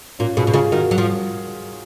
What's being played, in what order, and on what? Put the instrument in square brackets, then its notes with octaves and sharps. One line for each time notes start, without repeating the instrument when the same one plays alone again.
[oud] A#2 [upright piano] C#4 F4
[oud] B2 [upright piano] F4 G#4
[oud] B2
[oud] C#3 [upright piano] F4 G#4
[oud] D#3 [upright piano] F#4 A#4
[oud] F#3
F3